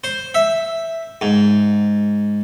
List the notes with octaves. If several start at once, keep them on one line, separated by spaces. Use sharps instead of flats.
C5
E5
G#2